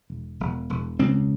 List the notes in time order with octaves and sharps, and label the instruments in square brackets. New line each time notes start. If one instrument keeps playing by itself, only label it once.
[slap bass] E1
E1
E1
C#2 C4